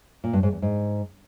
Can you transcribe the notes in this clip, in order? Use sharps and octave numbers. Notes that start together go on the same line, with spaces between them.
A#2
G2
G#2
E2
G#2